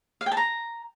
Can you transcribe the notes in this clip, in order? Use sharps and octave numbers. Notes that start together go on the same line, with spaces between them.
F5
G5
A5
A#5